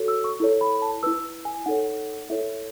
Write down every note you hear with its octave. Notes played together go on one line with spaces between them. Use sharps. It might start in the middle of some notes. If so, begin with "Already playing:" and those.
Already playing: F#4 A4 C#5
E6
C#6
E4 A4 C#5
B5
A5
E4 B4 E6
G#5
D#4 A4 C#5 F#5
E4 A4 C#5 E5